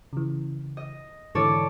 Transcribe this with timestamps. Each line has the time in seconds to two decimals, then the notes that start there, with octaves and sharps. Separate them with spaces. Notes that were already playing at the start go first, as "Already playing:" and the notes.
0.13 C#3 E3
0.77 D#5
1.35 G#2 D3 E3 A4 C#5 D5